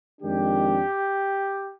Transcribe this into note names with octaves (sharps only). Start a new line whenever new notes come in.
F2 D#3 G#3 D4 G4